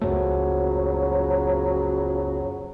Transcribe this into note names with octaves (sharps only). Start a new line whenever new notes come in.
C#2 F#2 C#3 F3 F#3 A3